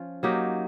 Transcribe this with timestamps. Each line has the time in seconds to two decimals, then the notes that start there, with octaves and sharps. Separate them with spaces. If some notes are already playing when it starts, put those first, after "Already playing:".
Already playing: F3 C#4 F4
0.23 F#3 A#3 D#4 G4